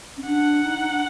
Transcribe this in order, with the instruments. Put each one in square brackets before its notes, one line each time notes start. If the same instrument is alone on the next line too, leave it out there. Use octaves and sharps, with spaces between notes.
[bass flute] C#4
[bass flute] D4 [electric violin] F#5
[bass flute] D#4
D#4
D4